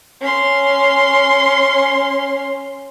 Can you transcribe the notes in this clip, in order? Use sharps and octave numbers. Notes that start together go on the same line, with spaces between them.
C#4 C6